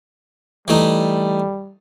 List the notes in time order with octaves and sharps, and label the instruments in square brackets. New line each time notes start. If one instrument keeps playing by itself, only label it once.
[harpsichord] E3 A3 D#4 [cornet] G3